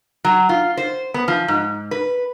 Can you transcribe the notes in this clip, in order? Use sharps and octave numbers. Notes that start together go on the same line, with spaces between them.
F#3
F4
C5
B3
F3
G#2
B4